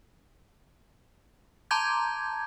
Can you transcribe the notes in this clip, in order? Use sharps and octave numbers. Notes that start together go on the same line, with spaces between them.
A5 A#5 C6 D6 G6 G#6